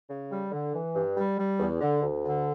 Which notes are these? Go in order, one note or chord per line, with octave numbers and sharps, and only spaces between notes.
C#3
G3
D3
E3
G2
G3
G3
E2
D3
D2
D3